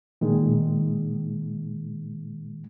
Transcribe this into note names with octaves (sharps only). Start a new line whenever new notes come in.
A#2 D#3 G#3